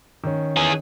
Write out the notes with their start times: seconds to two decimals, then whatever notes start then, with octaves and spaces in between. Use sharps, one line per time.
0.24 D#3 C#4
0.56 E3 G#4